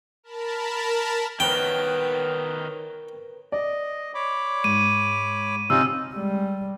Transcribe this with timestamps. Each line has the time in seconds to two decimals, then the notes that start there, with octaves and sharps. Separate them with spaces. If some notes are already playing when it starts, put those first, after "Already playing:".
0.23 A#4 A5 B5
1.40 D#3 B3 A#4 B4 C#5 G5
3.52 D5 D#5
4.14 C#5 B5 D6
4.64 G#2 D#7
5.70 C3 C#4 D#4 F4 E6
6.13 G3 G#3